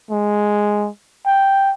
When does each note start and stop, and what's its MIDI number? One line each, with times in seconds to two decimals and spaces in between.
0.10 0.89 56
1.26 1.72 79